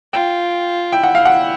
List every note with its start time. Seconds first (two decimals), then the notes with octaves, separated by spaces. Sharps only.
0.13 F4 G5
0.92 E4 G5
1.03 F#5
1.15 F5
1.25 F#5